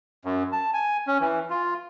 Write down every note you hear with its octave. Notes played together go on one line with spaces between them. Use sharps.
F#2
A5
G#5
C#4
E3
F4